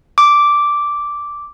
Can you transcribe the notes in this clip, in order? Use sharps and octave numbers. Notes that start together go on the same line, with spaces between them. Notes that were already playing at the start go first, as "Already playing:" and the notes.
D6